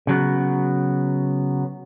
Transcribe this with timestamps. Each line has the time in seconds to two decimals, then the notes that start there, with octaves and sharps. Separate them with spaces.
0.07 C#3 F#3 B3